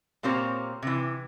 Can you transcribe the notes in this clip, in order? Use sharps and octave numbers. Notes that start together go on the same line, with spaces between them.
A#2 A#3 C4 G4 C#5 A#5
C3 E3